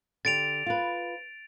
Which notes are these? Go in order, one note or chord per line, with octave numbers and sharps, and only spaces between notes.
D3 G4 A6 D7 F7
F4 B4